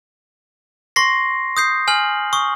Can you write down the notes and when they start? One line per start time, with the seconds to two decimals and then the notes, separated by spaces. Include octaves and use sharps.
0.96 C6 C#6 A#6 C7
1.57 D#6 G6 C7
1.88 G#5 F6 F#7
2.33 C#6 D#6